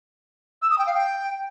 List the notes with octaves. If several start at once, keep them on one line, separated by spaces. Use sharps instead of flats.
E6
D#6
G5
F5
G5